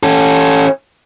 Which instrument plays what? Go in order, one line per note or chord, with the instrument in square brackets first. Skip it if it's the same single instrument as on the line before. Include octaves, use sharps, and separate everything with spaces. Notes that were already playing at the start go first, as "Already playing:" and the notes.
[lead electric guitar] C#4 A4